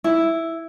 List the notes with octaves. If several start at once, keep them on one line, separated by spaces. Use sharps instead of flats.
E4